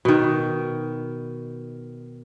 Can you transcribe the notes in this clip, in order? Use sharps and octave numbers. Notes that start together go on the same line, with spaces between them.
B2 D#3